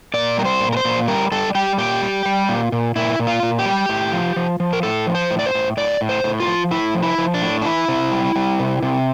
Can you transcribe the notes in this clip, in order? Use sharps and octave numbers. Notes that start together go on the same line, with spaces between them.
A#2 D5
G3 A#4
C5
A#2
A#4
C5
A#2
G3 A#4
G3 A4
G3 G4
A#2 G4
G3
G3
A#2
A#2
A#2 E4
A#2
F4
A#2
G4
G3
A2
F3
F3
F3
A#4
A2 A4
F3
C5
A2
D5
C5
A2
A2 D5
A2
C5
A2
F4
F3
A2 E4
F3
E4
F3
D4
A2
D4
E3 E4
C3
G3
G3
C3
C3